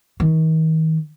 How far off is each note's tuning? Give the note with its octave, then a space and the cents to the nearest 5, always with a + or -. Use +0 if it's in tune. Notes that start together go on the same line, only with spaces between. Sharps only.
D#3 +40